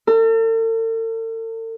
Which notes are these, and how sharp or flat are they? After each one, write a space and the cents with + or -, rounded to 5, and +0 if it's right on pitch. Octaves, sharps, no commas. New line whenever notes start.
A4 +45